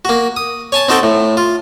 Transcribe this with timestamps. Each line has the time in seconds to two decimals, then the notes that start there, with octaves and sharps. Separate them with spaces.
0.05 A#3 F#4
0.36 D#6
0.72 C#5 G#5 A5
0.88 C4 D#4 F#4 A4 G5
1.03 A2
1.37 F4